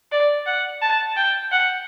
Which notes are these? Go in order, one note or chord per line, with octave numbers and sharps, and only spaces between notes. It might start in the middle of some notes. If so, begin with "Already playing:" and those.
D5
F#5
A5
G5
F#5